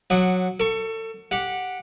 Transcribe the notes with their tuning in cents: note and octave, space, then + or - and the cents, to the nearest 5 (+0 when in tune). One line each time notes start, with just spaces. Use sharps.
F#3 -15 F#5 +0 D#6 -35
A4 +30 C#6 +0
G4 +0 F#5 -10